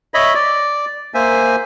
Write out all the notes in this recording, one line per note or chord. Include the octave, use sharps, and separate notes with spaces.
C#5 D#5 E5 B5
D5
A#3 C5 E5 G#5